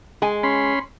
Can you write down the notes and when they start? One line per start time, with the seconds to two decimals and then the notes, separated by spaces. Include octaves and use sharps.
0.22 G#3 G#5
0.43 C#4 B5 C6